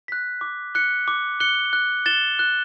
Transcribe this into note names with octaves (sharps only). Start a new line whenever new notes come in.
F#6 B6
D6
F#6 C#7 G7
D6
F#6 C#7 G7
F#6
A6 E7 G7
F#6